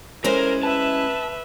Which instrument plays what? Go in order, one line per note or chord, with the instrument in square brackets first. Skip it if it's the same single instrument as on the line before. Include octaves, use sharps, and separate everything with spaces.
[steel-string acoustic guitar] G#3 C#4 E4 [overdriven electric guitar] A#4 [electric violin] C5
[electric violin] B4 E5 [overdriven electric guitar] A5